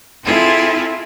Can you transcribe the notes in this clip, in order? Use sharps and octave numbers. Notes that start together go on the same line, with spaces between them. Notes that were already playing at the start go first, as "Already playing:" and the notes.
C4 E4 F4 G#4 A4